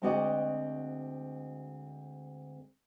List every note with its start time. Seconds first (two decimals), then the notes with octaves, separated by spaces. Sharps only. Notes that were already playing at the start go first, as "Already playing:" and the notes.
0.02 D2 G#3 C4 F#4 D5 D#5